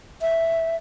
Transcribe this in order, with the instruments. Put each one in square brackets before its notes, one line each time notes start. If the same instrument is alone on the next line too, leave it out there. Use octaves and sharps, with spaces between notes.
[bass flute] E5